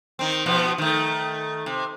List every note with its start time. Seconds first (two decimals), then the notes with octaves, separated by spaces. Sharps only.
0.19 D#3 C4
0.46 B2 F3 B3
0.78 D#3 A3
1.66 C3